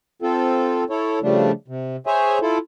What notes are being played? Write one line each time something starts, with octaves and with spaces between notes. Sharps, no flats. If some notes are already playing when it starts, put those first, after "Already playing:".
C4 F4 A4
E4 A4 C#5
C#3 F3 G3 A3 D4
C3
G#4 C5 C#5 E5 G#5
E4 F4 A4